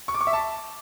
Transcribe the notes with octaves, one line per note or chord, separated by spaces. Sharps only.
C#6
D6
C#6
E5
A5